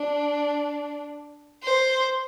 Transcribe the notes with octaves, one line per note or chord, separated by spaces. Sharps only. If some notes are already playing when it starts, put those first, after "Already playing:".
Already playing: D4
C5